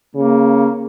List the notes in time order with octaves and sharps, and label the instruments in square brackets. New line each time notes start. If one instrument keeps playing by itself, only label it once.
[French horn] C#3 [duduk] A#3